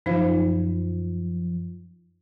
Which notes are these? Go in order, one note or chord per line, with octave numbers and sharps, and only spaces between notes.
F#2 F3 D#4 C5 F5